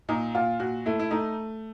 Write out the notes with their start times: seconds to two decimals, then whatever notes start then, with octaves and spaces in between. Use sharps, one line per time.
0.09 A#2 D#4
0.35 A#2 F4
0.60 A#2 F#4
0.86 A3 E4
0.99 E4
1.11 A3 D#4